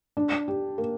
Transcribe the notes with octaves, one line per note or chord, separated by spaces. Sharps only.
D4
G4
A#3